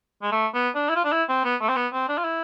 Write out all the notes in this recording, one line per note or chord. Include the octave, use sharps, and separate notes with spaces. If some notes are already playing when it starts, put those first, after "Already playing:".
G#3
A3
B3
D4
E4
F4
D4
E4
C4
B3
A3
C4
B3
C4
D4
F4
E4